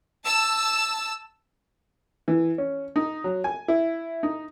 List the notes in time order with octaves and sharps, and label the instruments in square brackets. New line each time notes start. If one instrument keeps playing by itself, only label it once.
[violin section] A5 E6
[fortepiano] E3
C#4
D#4
F#3
G#5
E4
D#4